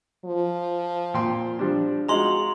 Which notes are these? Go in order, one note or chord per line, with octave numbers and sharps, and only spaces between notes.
F3
A#2 G5 C6
F3 G3 D4
G#3 D#4 F4 F#4 A#5 C6 F#7